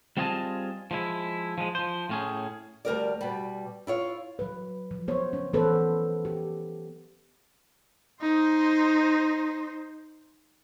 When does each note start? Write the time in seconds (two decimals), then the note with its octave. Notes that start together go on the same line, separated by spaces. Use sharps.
0.17 G3 C4 F4 G#4 D#5 A5
0.91 F3 G#3 E4
1.58 F3 G#3
1.75 F3 C5
2.09 A2 C#4 G#4
2.85 D2 G3 A#4 D5
3.21 B2 G3
3.87 E4 F4 C#5
4.39 F#3 B4
4.91 F3
5.08 B3 C5 C#5
5.33 C#4
5.53 E3 B3 C#4 A4 B4 C5
6.25 G4
8.22 D#4 C5